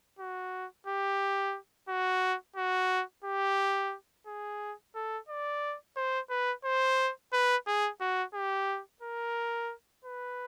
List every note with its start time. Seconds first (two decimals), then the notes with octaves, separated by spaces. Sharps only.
0.19 F#4
0.87 G4
1.89 F#4
2.56 F#4
3.24 G4
4.27 G#4
4.95 A4
5.29 D5
5.96 C5
6.30 B4
6.65 C5
7.33 B4
7.67 G#4
8.01 F#4
8.34 G4
9.02 A#4
10.05 B4